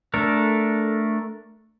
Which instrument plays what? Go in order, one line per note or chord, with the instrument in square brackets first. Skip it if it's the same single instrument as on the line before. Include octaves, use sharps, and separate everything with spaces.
[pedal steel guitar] A3 D4 A4 A#4